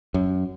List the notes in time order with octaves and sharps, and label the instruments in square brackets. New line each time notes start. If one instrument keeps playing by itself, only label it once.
[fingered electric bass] F#2